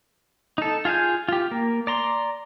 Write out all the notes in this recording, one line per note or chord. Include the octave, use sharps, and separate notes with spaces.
D#4 A4
F4 G#4 F5 G#5 G6
F4 G4
A#3
D5 A#5 C6